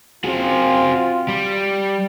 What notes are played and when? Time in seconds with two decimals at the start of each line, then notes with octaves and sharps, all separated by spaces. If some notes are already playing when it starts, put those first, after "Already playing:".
0.24 C4 F4 F#4 G#4
1.28 G3